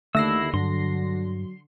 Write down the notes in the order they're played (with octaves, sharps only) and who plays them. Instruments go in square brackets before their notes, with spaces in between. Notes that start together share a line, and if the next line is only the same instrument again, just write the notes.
[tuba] D#2 [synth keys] D3 A#6 C7 [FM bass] A3 [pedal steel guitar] E4 E6
[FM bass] G2 [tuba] F#3 [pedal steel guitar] C6